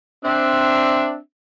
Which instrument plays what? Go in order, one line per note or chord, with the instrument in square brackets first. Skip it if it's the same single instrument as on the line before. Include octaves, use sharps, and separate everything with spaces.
[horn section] C4 D4 E5